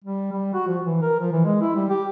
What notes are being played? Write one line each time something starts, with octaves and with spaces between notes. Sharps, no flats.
G3
G3
F#4
F3
E3
A#4
F3
E3
G#3
E4
G3
G4